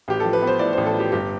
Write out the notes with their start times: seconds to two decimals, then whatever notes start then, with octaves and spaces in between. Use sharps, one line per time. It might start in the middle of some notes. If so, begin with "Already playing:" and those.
0.08 A1 G4
0.20 A4
0.24 F3
0.33 B4
0.42 B3 C5
0.59 A2 D5
0.73 C5
0.78 A1
0.86 A4
0.95 F3 G4
1.12 G1 G4